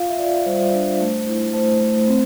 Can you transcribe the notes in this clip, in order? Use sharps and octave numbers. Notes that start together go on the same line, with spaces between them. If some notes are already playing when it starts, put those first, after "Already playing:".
Already playing: F4 F5
E5
F4 D5
G3 C5
D4
A3
E4
A3 C5
A3
C4